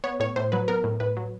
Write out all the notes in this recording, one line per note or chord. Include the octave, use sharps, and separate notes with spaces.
B3 C#5
A2 C#5
A2 C5
F#3 B4
B3 A#4
A2
A2 B4
F#3